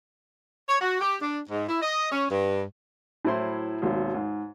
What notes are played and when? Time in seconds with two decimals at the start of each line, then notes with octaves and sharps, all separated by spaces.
0.69 C#5
0.81 F#4
1.01 G4
1.22 D4
1.50 G#2
1.69 E4
1.82 D#5
2.12 C#4
2.31 G2
3.25 A2 F#3 E4 C5 C6
3.82 G#1 D#2 B2
4.14 G#2